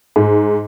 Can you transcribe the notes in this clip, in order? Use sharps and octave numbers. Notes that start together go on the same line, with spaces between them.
G#2